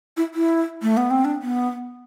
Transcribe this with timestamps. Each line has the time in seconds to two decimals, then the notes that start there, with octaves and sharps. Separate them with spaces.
0.17 E4
0.34 E4
0.82 A3
0.97 B3
1.11 C4
1.25 D4
1.42 B3